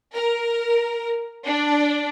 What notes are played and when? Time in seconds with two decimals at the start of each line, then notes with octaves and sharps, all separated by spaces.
0.16 A#4
1.47 D4